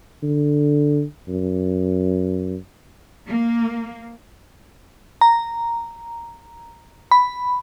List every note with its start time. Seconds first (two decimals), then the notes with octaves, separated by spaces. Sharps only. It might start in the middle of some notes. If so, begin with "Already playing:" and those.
0.23 D3
1.28 F#2
3.27 A#3
5.21 A#5
7.11 B5